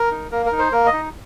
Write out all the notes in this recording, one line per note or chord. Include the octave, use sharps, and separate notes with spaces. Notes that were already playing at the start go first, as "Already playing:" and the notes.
Already playing: A#4
D#4
A#3 A#4
A#4
D#4
C5
A#3 A#4
D#5
D#4